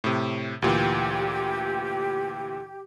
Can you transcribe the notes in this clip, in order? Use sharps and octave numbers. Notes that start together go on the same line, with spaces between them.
A2 C3
D2 A#2 E3 G4